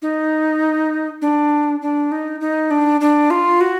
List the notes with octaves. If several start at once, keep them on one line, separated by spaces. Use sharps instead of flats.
D#4
D4
D4
D#4
D#4
D4
D4
F4
F#4